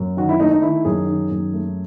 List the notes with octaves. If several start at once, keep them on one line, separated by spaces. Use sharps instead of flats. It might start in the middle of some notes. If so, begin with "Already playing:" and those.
Already playing: F#2
D#3 F#4
E4
A3 D#4
D#4
D#3 E4
F#2 G#4
D#3
F#2
A3